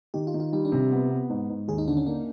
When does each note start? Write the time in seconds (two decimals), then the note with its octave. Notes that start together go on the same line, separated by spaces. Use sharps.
0.14 D#3 G4
0.27 F4
0.34 D#3
0.40 F4
0.53 G3 D#4
0.65 D4
0.72 C3
0.92 B3
1.10 B3
1.29 G#2
1.49 G#2
1.68 D#2 G#4
1.78 D#4
1.88 D3 D4
1.97 C#4
2.06 A#3 D4